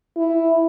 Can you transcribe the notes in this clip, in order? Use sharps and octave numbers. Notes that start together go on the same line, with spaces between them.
E4